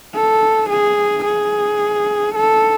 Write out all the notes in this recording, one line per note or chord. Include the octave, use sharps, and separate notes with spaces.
A4
G#4
G#4
A4